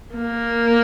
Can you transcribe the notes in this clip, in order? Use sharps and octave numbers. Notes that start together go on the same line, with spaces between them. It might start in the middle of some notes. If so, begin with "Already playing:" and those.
A#3